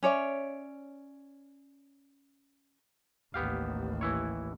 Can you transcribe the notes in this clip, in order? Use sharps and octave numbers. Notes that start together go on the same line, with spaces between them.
C#4 C#5 D5 E5
A1 D#2 B3 G4 F5
E3 E4 C#5